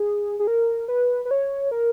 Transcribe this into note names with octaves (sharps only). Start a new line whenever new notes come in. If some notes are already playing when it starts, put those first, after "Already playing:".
Already playing: G#4
G#4
A#4
B4
B4
C#5
A#4